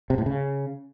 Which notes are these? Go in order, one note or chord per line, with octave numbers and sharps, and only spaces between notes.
C3
A2
C#3